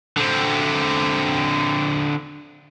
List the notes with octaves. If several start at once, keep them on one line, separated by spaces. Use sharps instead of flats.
D3 C4